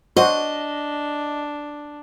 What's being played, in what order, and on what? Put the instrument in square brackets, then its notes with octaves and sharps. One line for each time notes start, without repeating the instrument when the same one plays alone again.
[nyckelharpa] D4 [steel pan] F#4 C5 [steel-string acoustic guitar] D#5